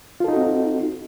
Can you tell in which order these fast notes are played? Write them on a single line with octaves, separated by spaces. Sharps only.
F4 A4 D#4 F#4 C4